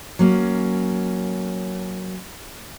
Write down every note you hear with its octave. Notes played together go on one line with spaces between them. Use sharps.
F#3 A#3 C#4